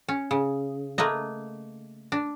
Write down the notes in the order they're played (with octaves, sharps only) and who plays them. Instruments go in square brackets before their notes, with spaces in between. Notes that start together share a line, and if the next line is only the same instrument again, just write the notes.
[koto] C#4
C#3
A3 A#3 B4 D#5
D4